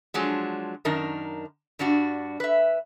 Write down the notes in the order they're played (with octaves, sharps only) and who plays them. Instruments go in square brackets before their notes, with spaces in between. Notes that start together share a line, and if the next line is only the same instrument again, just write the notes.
[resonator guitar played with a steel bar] F3 F#3 G#3 D4
F#2 D#3 D4 D#4 A#4
G2 G3 D4 F#4
B4 E5